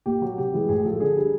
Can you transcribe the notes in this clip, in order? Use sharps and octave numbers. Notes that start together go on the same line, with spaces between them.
A#2 G4
F#3 F#4
C3 G4
E3 G#3
A2 G#4
F3 G#3 A4
D3 G#4
G3